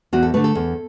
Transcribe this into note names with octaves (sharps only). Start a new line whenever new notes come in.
E2 F#4
A4
D3 A3 B4
A4
E2